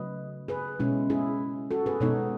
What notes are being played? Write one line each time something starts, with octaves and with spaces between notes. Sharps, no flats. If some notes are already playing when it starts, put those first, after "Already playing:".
Already playing: C#3 F#3 A3 B4 D#5
G#4 B4
B2 G#3 C#4 E4
E4 G#4
F#4 A4
G#4 B4
B2 G#3 B3 D#4 A4 C#5